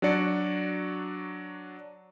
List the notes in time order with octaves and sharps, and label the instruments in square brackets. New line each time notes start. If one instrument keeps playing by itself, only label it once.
[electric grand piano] F#3 D4 F#4 D5 C#7